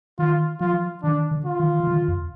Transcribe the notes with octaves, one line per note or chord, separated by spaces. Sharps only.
D#3 F4
F3 F4
D#3 D4
D3
F4
D#3
D#3
D3
F2